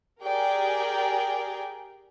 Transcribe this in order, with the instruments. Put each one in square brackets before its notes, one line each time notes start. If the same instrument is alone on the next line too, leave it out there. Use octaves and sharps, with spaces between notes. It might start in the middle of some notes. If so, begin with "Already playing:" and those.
[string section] G4 G#4 A#4 D5 G5 G#5